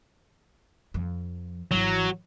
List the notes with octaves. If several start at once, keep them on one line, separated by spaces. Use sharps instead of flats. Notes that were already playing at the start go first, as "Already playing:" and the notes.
F2 F3
G#1 E3 F#3